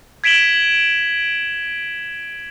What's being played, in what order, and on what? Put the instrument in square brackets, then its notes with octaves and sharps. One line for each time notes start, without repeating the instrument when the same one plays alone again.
[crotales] G#6 B6 D7 E7 F#7 G7